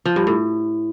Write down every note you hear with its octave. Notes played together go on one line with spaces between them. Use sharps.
F3
G2
A2